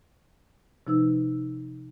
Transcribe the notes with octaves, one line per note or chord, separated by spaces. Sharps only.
C3 F3 D#4 B4 E6